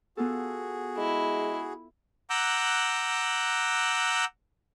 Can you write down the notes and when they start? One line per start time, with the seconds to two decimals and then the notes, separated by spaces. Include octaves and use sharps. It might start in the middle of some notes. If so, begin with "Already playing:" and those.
0.17 B3 F4 F#4 G#4 A4
0.97 G#3 E4
2.30 F#5 A#5 D6 E6 F#6 G6